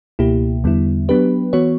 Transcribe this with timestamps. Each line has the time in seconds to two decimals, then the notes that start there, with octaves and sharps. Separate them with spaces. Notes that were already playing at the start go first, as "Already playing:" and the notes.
0.19 C#2 B2 A#3 E4 G4
0.64 E2 D3 G3 B3 E4
1.09 F#3 B3 D4 G4 B4
1.53 E3 B3 F#4 C#5